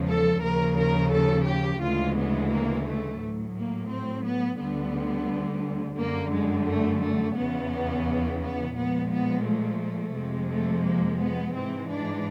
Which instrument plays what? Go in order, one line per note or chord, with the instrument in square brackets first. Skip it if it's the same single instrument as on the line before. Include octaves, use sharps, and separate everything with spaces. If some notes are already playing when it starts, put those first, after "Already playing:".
Already playing: [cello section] E2 C#3 F3 G#3
A4
D#2 C#3 F3 A#4
A#4
A4
G4
D2 C#3 E3 G#3 F4
B3
A#3
A3
A2 F#3
A#3
C4
B3
D2 D3 G3 B3
F#2 D3 G3 A#3
G#3
A3
A3
E2 C#3 E3 B3
B3
A#2 F3 G#3 B3
B3
A3
F2 C3 F3 G#3
A3
A#3
B3
G#2 E3 G#3 C4
D4